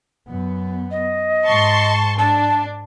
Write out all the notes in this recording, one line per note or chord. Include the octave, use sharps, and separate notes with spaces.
F#2 B3
D#5
G#2 A5 C6 C#6
D4 A5